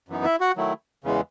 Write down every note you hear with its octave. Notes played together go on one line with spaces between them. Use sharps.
F#2 E3 B3 D#4
E4 E5
F#4 F#5
D#3 F#3 A3 E4
E2 C#3 E3 G#3